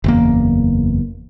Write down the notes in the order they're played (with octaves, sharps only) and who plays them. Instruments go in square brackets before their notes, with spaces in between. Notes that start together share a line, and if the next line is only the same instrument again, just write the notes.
[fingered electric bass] F#1 E2 A#3